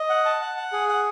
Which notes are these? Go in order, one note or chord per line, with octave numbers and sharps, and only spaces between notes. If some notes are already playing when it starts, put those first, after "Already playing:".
Already playing: D#5
F#5
A5
F#5
F#5
G#4
F#5